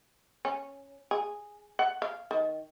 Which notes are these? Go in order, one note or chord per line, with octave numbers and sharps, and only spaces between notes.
C#4
G#4
F#5
F5
D#3